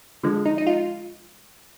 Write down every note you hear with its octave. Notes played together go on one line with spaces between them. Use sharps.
D3 F3 G#3
D#4
D#4
F4